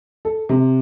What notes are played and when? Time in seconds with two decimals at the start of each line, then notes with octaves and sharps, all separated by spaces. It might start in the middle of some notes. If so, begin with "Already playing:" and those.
0.25 A4
0.49 C3